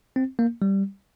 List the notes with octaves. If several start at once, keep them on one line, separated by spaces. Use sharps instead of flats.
C4
A#3
G3